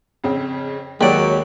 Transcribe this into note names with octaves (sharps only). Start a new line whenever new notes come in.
F2 C#3 C4
D#2 F#3 G#3 G4 D5